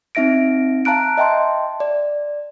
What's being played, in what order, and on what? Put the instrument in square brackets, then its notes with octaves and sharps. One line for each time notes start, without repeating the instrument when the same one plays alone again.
[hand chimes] C4 D#4 E5 A#6 D7
F5 A5 A#5 F#6 D7
D#5 E5 G5 A5 C6
D5